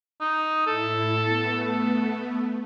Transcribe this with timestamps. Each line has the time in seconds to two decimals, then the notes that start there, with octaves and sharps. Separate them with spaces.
0.21 D#4
0.67 A2 E4 A4
1.15 A3 B3
1.61 A4